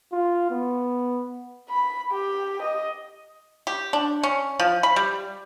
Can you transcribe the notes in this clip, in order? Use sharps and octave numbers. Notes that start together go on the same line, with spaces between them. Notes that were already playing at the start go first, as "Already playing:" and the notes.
F4
B3
B5
G4
D#5
G4
D4
C#4
F3
B5
G3